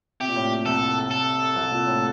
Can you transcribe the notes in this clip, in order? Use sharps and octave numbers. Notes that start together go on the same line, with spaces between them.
C3 G4
A#2
A2
A#2
C2 C3 A4
A4
C2 C3
A#2
A2